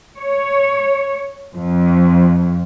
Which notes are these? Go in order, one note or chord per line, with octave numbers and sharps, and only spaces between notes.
C#5
F2